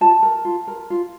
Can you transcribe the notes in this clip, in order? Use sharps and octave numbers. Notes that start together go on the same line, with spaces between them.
F4 A5
A#4
F4
A#4
F4